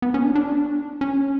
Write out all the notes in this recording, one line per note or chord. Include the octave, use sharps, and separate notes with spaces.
B3
C#4
D4
D4
C#4